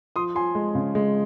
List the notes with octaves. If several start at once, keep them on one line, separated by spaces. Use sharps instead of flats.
F3 C6 D#6
F3 G#5 C6
G#3
C#3
G#3